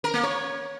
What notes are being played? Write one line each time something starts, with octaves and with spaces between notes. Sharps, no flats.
A#4
A#3
C#5